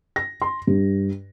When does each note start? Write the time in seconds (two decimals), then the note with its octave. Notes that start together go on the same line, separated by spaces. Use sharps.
0.16 A#6
0.42 C6
0.67 G2